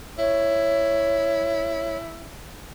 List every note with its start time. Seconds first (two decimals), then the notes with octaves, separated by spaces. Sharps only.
0.18 E4 C#5